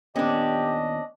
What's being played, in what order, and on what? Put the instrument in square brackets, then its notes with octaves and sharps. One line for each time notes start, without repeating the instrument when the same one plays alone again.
[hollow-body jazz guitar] D#2 A#2 B3 [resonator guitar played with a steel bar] C#4 D4 [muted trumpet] G4 [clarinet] D#5